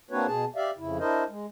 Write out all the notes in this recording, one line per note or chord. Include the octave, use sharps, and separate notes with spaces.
A#3 C4 D4 F#4 B4 C#5
B2 G#4 A5
G4 D5 E5 F5
F2 C#3 E4
D4 E4 A#4 C5 D#5
G#3